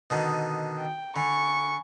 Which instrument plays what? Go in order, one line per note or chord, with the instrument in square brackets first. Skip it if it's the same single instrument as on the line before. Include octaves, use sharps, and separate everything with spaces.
[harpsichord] B2 D3 D#3 [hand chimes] A5 D#6
[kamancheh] G5
[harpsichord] D3 [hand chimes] G#5 B5 [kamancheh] C#6